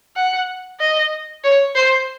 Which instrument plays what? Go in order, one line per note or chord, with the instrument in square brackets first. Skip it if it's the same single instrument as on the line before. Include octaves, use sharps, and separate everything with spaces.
[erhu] F#5
D#5
C#5
C5